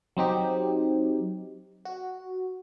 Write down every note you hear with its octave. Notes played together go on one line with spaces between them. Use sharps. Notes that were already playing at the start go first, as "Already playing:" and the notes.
F#3 C4 D#4 G4
F#4